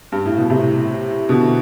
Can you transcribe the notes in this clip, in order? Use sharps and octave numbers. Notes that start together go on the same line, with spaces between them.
G2
A2
B2
A2 C3
B2 D3